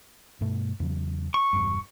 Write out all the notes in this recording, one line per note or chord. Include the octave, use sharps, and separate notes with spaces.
G2 B2 A3
E2 C#3 F#3
C#6
E1 G2